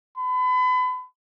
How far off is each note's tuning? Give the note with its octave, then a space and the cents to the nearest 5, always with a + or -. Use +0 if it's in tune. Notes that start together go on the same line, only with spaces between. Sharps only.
B5 +35